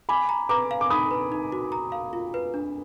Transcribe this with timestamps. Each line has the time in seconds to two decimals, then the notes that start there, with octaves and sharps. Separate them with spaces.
0.09 G#5 B5 D6
0.29 A#5
0.49 B4 A#5 D6
0.71 F5
0.81 D6
0.90 D#4 B5 D#6
1.11 B4
1.32 D#4
1.52 F#4
1.72 A#5
1.92 F5
2.13 F4
2.34 B4
2.54 D4